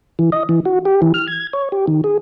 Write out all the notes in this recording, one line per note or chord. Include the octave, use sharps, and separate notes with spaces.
E3
D#5
E3
F#4
G4
E3
F6
G#6
C#5
G4
D#3
G#4